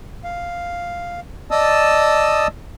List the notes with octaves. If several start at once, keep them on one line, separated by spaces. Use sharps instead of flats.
F5
D5 D#5 A5 D#6 E6